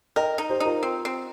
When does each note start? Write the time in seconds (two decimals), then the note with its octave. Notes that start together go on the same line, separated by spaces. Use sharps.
0.16 A#4 D#5 G5
0.38 D#4
0.50 G4 C5
0.60 D#4
0.66 F4 A#4
0.83 C4
1.05 C4